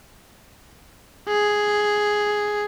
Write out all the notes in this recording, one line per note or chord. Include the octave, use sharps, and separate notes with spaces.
G#4